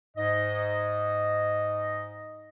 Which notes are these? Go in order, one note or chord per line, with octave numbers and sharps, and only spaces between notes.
G#2 D#5